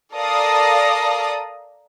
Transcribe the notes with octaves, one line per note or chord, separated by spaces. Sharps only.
A4 A#4 D5 F5 A#5 D#6